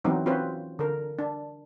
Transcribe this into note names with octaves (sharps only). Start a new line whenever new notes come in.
E3 F#3 B3 C4 D#4
C4 C#4 F4 F#4 B4 C5
D3 A#4
D4